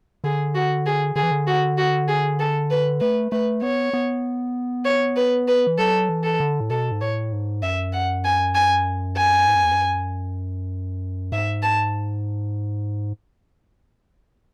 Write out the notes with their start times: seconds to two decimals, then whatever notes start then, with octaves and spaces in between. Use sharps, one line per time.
0.24 D3 G#4
0.55 F#4
0.86 G#4
1.16 D3 G#4
1.23 E3
1.31 D3
1.47 F#4
1.78 F#4
2.08 G#4
2.40 A4
2.71 B4
3.00 A3 B4
3.32 A3 B4
3.62 B3 C#5
3.93 B3
4.85 C#5
5.16 B4
5.48 B4
5.67 E3
5.78 F#3 A4
6.09 E3
6.24 A4
6.40 D3
6.60 A2
6.70 B2 A4
6.91 G#2
7.01 A2 C#5
7.32 G#2
7.62 F#2 E5
7.93 F#5
8.24 G#5
8.55 G#5
9.17 G#5
9.47 G#2
9.55 F#2
9.64 E2
9.71 F#2
11.32 G#2 E5
11.63 A5